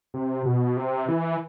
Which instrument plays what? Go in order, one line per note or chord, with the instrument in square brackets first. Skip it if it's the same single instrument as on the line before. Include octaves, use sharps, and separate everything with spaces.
[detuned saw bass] C3
B2
C3
E3